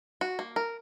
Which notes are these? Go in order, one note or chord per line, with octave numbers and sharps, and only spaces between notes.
F#4
A#3
A#4